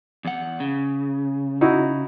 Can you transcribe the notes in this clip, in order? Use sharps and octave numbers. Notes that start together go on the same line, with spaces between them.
E2 F#5
C#3
D#4 E4 F#4